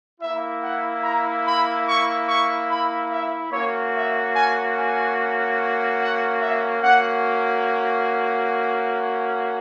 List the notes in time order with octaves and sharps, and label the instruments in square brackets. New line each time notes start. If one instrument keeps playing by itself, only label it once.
[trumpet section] A#3 E4 E5
F#5
A#5
B5
C#6
C#6
B5
E5
A#3 C#4 F#4 C#5
E5
G#5
G#5
F#5
E5
A#3 C#4 F#4 F#5